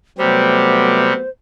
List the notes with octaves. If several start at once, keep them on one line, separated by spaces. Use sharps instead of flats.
C3 F#3 G3 A3 B3 C5